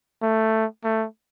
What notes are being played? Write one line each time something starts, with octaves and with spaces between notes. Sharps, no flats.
A3
A3